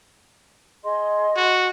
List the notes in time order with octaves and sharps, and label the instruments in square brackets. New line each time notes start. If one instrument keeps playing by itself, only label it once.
[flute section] G#4 D#5 C6
[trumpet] F#4